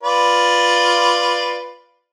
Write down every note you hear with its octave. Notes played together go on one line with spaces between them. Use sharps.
F4 B4 D5